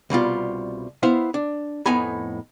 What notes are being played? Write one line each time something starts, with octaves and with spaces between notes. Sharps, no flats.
C2 B2 G3 F4
B3 E4 C5 F5
D4
F2 A2 B3 D#4 G#5 B5